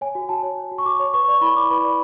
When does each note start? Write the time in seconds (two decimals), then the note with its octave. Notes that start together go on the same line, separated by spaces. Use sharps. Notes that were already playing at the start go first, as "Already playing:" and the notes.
0.01 C#5 G#5
0.15 F#4
0.29 F#4 A5
0.43 C#5
0.57 C#5
0.71 F#4
0.78 C#6
0.86 F#4 D6
1.00 C#5
1.14 B4 C#6
1.28 D5 C#6
1.41 E4 B5
1.56 E4 D6
1.71 B4 B5
1.84 D5